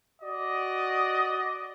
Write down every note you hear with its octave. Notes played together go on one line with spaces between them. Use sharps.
F#4 D5 D#5